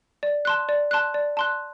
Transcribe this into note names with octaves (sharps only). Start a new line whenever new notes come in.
D5
A5 C6 F#6
D5
A5 C6 F#6
D5
A5 C6 F#6